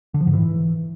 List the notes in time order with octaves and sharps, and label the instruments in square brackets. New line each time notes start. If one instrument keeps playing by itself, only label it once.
[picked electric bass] D3
F3
G#2
E3